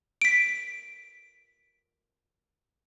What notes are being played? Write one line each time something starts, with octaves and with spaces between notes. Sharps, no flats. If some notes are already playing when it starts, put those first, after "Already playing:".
B6 D7